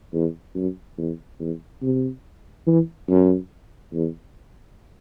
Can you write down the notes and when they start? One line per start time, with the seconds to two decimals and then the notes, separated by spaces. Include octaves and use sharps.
0.13 E2
0.55 F#2
0.98 E2
1.39 E2
1.82 C3
2.67 E3
3.09 F#2
3.93 E2